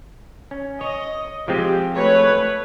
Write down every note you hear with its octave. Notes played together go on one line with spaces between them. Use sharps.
C#4
C#5 D#5
F3 G#3 C4 G4
A3 B4 C#5